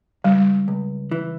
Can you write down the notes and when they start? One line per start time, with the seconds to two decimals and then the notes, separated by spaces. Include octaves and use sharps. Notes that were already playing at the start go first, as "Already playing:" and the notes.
0.24 C#2 G3
0.68 C#2
1.11 E3